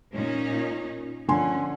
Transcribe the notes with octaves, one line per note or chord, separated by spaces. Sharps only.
A#2 C#4 D#4
D3 F3 C#4 G#5 C6